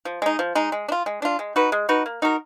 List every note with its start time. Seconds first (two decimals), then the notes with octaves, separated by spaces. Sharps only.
0.05 F3
0.22 G#3 D#4
0.39 F3
0.55 G#3 D#4
0.72 G#3
0.88 D4
0.92 F4
1.06 G#3
1.22 D4 F4
1.39 G#3
1.56 D#4 F#4 B4
1.72 G#3
1.89 D#4 F#4 B4
2.06 A#3
2.22 D#4 F#4 A#4